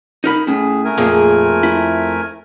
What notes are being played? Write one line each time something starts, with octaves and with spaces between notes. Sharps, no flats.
D#4 A#4 B5
A2 C#4 G#4
A3 A#4 G#5
F2 A#2 A#3 G#4
E4